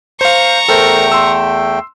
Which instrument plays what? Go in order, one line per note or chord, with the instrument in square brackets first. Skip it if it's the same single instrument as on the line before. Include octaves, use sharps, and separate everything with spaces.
[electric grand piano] C5 F5 [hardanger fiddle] A#5 C#6
[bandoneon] E2 A3 G5 [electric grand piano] A4 A#4 C5
[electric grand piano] C6 E6